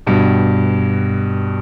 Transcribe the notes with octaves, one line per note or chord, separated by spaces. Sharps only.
G2 B2